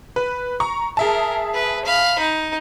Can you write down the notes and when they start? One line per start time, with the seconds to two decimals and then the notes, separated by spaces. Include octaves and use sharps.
0.16 B4
0.60 A#5 C#6
0.97 G#4 A#4 E5 A5
1.54 B4
1.85 F5 B5
2.19 D#4